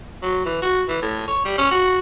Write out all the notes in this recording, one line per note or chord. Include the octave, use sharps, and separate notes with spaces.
F#3
E3
F#4
E3
A2
C#5
G3
C#4
F#4